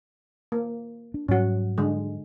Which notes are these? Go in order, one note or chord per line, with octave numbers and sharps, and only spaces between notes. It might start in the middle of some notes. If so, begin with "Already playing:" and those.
A#3
D4
G#2 F#3 G3 C#4 F#4
D3 G#3